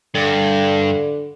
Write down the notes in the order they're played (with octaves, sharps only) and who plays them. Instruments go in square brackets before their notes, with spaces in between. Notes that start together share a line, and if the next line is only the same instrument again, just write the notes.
[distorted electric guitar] G2 [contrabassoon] D3